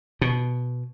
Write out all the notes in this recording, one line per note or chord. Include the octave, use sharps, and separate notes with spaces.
B2